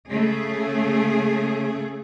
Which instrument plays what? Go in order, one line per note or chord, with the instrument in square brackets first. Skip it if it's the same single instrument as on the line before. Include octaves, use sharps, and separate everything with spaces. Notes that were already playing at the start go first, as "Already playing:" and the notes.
[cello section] C#3 A3 G#4